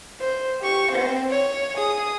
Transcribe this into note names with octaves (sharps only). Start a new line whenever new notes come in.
C5
G4 C#6
C4 C5
C#5
G#4 D#6